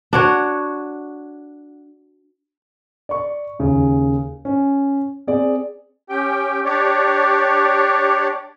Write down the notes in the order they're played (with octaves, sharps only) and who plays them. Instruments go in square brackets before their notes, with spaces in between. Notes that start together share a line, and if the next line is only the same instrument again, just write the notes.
[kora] D4 F#4 C#5
[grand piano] D5 C#6
D#2 C#3
C#4
C4 G#4 D5
[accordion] C#4 G4 G5
D4 G4 C#5 D5